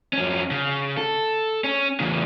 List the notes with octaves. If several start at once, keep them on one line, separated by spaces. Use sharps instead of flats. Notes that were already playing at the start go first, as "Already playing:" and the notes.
F2 C#4
C#3
A4
C#4
E2 C#3